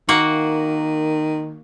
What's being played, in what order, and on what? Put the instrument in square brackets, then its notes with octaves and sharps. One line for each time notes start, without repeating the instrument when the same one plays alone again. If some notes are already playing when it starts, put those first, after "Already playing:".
[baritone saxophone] D#3 [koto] A#3 F#4